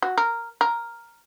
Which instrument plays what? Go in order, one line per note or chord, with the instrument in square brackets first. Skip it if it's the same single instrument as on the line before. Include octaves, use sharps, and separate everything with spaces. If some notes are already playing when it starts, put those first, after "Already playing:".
[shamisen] F#4
A#4
A#4